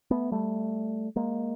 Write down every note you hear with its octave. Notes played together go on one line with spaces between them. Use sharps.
A3 B3
G3 A3
G#3 A#3